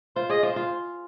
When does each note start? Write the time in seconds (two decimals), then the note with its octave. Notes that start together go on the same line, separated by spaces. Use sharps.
0.16 F4 C5
0.29 G#4 D#5
0.43 F4 C5
0.56 F4